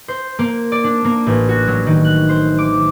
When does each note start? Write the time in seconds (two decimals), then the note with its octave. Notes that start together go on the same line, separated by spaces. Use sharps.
0.08 C5
0.39 A#3
0.72 D5
0.84 D4
1.05 A#3
1.26 A1
1.49 F#4
1.67 F#3
1.86 D#3
2.04 F#6
2.29 C5
2.58 D6